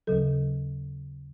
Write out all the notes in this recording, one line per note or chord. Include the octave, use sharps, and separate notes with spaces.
D#2 C#3 F#3 A4